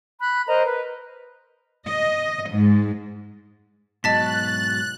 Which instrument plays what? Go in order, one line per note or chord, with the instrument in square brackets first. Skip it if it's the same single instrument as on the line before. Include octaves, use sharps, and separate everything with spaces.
[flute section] B5 F#6
A#4 C5 D#5 A#5
B4
[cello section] D#5
G#2
[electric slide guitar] G#2 B2 F#3 [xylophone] D#5 A5 B6 [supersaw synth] F#6 [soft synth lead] A6